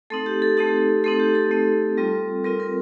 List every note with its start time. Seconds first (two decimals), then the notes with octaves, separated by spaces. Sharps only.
0.10 A3 C4 D#4 A4
0.26 G4
0.42 A4
0.57 A3 C4 D#4 G4
1.04 A3 C4 D#4 A4
1.20 G4
1.35 A4
1.51 A3 C4 D#4
1.98 G3 C4 F4
2.44 G3 C4 F4 A#4
2.60 A#4